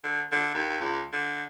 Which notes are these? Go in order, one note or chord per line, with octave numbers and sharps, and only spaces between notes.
D3
D3
D#2
C#2
D3